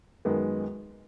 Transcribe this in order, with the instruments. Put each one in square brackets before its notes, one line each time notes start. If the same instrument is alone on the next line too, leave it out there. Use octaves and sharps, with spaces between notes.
[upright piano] F#2 D#3 G#3 B3